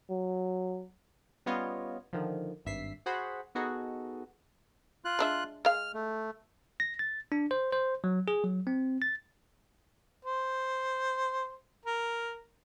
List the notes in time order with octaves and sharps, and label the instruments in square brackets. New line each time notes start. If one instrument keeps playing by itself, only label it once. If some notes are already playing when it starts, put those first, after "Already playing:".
[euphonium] F#3
[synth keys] G3 B3 C#4 F4 C#5 D#5
D3 D#3 F3
G#1 G2 E5 B6 C7
F#4 G#4 C5 F#5 B5
B3 D#4 F#4 G#4 A4 D#5
[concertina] F4 F#6
[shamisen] G#3 D4 E5
[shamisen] G#3 F5 [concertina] F6
[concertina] A3
[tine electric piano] A#6
A6
D4
C5
C5
F#3
G#4
F#3
C4
A6
[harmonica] C5
A#4